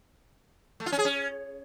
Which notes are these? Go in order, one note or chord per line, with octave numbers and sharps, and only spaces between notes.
A3
F4
C#4
G#4
C#4